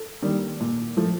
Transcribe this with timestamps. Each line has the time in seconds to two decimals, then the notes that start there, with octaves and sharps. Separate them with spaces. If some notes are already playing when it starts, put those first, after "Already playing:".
Already playing: A4
0.22 D#3 G3 A#3
0.60 A#2
0.97 F3 A3